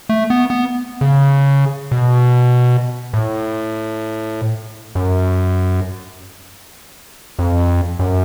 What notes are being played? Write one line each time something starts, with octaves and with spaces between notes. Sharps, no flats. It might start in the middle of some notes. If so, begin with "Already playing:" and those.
A3
B3
B3
C#3
B2
A2
F#2
F2
F#2